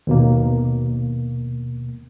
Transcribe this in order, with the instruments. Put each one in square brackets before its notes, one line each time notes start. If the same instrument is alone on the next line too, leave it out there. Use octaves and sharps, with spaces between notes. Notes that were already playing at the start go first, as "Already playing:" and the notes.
[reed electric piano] D#2 B2 A#3